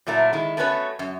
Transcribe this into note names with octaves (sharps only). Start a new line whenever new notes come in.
A#2 F#3 A3 E4 A#4
D#3 G#3 E4
A3 B3 C#4 F#4 B4 C#5
F#2